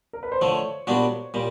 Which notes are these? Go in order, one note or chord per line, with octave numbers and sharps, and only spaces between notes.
A#4
B4
C5
D3 F3 A3 C#5
A#2 G3 B3 D4 F#4
A#2 G3 A#4